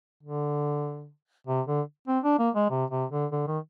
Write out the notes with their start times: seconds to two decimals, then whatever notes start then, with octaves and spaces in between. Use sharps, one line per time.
0.23 D3
1.47 C3
1.67 D3
2.08 C4
2.24 D4
2.39 A#3
2.55 G#3
2.70 C3
2.91 C3
3.11 D3
3.32 D3
3.47 D#3